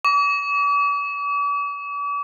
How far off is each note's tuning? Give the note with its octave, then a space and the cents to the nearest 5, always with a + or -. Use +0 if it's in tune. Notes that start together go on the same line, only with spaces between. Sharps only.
D6 -45